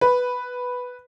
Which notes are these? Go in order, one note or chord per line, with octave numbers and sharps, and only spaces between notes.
B4